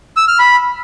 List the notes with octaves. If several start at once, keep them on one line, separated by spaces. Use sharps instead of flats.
E6
F6
B5